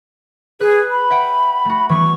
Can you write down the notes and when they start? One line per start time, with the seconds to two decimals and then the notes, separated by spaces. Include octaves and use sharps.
0.60 G#4 B4 F#6
0.90 B5
1.10 E5 F#5 G5
1.65 A3 F#4
1.89 E3 G3 B3 C#6